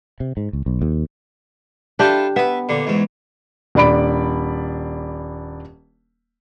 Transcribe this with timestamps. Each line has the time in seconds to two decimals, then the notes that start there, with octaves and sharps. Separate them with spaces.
0.20 C3
0.37 G#2
0.53 C#2
0.66 B1
0.82 D#2
1.99 D4 E4 F4 G4 A4
2.36 B3 B4 E5
2.69 A#2 D3
2.87 E2 G#2
3.75 D#1 D4 D5 B5 D7